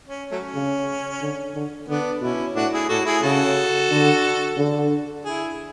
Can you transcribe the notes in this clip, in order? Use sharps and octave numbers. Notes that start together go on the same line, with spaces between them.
C#4
F#3 A3 C#4
C#3
D3
D3
D3 B3 D4
B2 C#4 E4
A2 D4 F#4
E4 G#4
A2 F#4 A4
E4 G#4
C#3 F#4 A4
D3
D3
E4 G#4